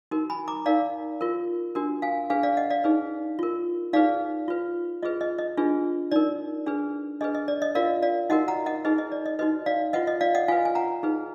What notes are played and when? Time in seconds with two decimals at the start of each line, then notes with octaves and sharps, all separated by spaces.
0.11 D#4 F#4 A#4
0.30 G#5 B5
0.48 A#5 D6
0.66 D#4 A#4 D5 F5
1.21 F4 A#4
1.75 D4 F#4 A#4
2.02 F5 G#5
2.30 D4 G#4 B4 F5 G#5
2.43 D5 F5
2.57 D#5 F#5
2.70 D5 F5
2.84 D#4 G#4 B4
3.39 F4 A#4
3.93 D#4 G#4 B4 D5 F5
4.48 F4 B4
5.03 F4 G#4 B4 D#5
5.21 D#5
5.38 D#5
5.57 D4 F4 G#4 B4
6.11 D#4 A#4 D5
6.66 D4 G#4 B4
7.21 D4 G#4 B4 D#5
7.35 D#5
7.48 D5
7.62 D#5
7.75 F4 A#4 D5 F5
8.03 D5 F5
8.30 D#4 F#4 A#4 D#5 F#5
8.48 F#5 A#5
8.66 D#5 F#5
8.85 D#4 G#4 B4 D#5
8.98 D#5
9.12 D5
9.26 D#5
9.39 D#4 F#4 B4 D#5
9.66 D5 F5
9.93 F4 B4 D#5 F#5
10.07 D#5
10.21 D5 F5
10.35 D#5 F#5
10.48 F4 B4 F5 G#5
10.65 G#5
10.75 F#5 A#5
11.03 D#4 G#4 B4